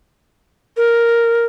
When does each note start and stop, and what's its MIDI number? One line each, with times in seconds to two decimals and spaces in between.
0.77 1.45 70